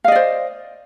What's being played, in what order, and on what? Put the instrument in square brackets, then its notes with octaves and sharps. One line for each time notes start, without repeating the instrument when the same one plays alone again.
[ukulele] F5
D#5
D5
C5